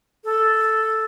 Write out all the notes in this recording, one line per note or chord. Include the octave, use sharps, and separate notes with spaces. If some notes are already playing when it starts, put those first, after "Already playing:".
A4